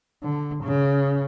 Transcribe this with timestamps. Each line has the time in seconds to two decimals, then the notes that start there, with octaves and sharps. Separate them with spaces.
0.23 D3
0.63 C#3